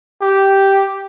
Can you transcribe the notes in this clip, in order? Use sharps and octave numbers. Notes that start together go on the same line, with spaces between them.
G4